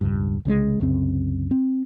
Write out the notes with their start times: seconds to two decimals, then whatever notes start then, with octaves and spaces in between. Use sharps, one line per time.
0.01 E1 C#2 G2
0.45 C2 C#3 G3 G#3
0.80 C2 F#2 C#3 C4
1.51 C4